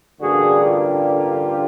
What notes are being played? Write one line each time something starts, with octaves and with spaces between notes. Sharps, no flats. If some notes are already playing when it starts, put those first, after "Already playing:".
A1 G2 D3 G3 A#3 F#4 G#4
F4 G4